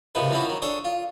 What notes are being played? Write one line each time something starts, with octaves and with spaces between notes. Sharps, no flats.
C#2 G#2 C3 D#3 F3 B4
E3 F3 C4 C#4 E4 F#4
D#3 F#3
D4 G#4 A4 C5 C#5
F4